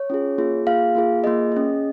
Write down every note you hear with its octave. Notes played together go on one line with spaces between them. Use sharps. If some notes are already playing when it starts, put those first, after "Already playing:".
Already playing: C#5
C#4 F4 G#4
A#3 F4 G#4
A#3 F4 G#4 F5
A#3 F4 G#4
A#3 F4 G#4 D#5
C#4 G#4